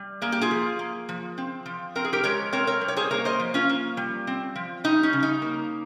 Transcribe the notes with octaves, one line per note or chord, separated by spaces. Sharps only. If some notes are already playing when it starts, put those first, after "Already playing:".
Already playing: G3
A#3 G#4
G4
F4 G#4
F3
A#3
F3
C4
F3
C4 A#4
G#4
G4 A#4
G#3 A#4 C#5
C4 A#4 C#5
A#4 C#5
G3
C#5
G#4 C5
A#3 A#4 C#5
C5 D#5
F3
C#4 F4
A#3
G3
C4
F3
G3 D#4
C#4
C#3
D#4
A#3